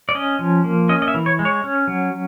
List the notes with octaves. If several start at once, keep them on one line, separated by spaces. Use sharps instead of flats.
D5
C#4 D#5
F3
A#3
C#4 D#5
D#5
E5
E3
C#5
G#3
C#5
C#4
F#3